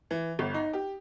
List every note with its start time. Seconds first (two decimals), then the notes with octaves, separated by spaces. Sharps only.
0.11 E3
0.39 G1
0.54 D#4
0.73 G4